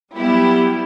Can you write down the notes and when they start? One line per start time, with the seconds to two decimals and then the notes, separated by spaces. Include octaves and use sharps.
0.14 F#3 G3 B3 E4 G4